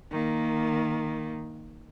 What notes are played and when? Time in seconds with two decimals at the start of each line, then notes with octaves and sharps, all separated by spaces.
0.11 D#3 A#3